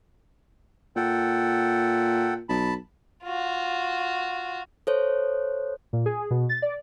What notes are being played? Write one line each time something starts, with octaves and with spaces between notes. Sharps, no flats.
A#2 A4 F#5 G5
B1 A5 B5
F4 F#4
A4 C5 C#5
A#2
G#4
B2
A6
D5